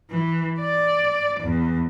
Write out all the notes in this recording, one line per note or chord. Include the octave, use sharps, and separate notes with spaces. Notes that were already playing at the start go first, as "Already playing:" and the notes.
E3
D5
E2